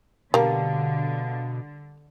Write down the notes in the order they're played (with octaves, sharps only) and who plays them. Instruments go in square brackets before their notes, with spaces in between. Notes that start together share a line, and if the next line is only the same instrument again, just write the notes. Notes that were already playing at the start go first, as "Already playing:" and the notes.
[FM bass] B2 [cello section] D3 [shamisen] G3 A#3 [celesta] F5 A5